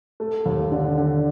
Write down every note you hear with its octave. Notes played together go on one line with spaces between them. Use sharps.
A3
D#2
D3
D3